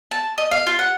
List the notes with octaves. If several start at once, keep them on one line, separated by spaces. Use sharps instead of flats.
A5
D#5
F5
F4
F#5